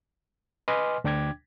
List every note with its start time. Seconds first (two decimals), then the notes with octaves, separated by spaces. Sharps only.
0.68 B4 D#5 G#5 C6 D6 F6
1.04 D2 D4 G5 D6 G#6